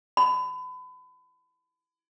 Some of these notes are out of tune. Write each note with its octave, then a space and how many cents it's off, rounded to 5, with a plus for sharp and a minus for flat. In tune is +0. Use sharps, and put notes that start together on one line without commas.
B5 +35